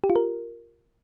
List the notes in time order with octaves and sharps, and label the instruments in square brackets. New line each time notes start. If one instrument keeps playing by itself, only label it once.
[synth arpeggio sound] G4
F4
A#4